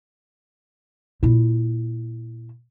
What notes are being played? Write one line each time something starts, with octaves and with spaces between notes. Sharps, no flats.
A#2 E4